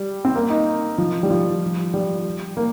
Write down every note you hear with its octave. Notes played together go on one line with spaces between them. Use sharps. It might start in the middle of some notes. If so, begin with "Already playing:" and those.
Already playing: G3
C4
A#3
D#4
F3
G3
F3
G3
A#3